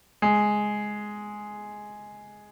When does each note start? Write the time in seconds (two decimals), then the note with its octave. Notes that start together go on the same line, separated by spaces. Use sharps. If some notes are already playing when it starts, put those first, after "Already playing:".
0.22 G#3